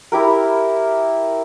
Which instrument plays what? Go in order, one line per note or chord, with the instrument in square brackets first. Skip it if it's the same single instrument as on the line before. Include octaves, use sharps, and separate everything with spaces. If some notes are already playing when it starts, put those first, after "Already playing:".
[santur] E4 G4 A#4